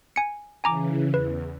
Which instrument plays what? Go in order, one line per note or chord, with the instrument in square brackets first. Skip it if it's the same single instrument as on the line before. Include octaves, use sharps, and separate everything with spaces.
[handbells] G#5 C#7
[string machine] C#3 E3 [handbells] G#5 A#5 D6
[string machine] E2 [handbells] B4